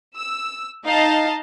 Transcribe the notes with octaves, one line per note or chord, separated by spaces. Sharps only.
E6
D#4 D#5 F5 A5